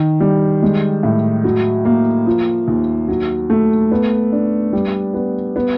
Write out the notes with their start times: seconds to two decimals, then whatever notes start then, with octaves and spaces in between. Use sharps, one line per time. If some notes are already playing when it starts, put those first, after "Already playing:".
Already playing: D#3
0.20 G3
0.63 G#3
1.03 A2
1.44 F#3
1.85 A#3
2.26 F3
2.68 D#2
3.08 F#3
3.50 A3
3.92 B3
4.32 D4
4.73 G3
5.14 B3
5.56 B3